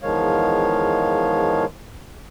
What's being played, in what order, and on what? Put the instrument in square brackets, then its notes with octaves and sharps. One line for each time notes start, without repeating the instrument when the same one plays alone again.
[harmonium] E2 D#3 F3 G#3 C#5 F5